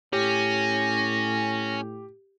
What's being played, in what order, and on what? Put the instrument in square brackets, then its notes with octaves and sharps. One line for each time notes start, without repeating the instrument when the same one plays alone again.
[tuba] A2 [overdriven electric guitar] C#4 [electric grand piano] G4 [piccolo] A#6